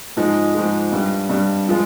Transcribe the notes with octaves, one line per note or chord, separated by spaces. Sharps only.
G#2 F3 G#3 D#4
G#2 F3 G#3
G2 G3
G2 G3
F3 G#3 F4